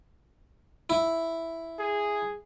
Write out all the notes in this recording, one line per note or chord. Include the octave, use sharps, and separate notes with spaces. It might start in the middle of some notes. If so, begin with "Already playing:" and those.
E4
G#4